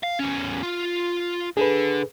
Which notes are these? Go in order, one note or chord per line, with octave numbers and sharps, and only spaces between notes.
F5
E2 C#4
F4
D3 G#4 A4 B4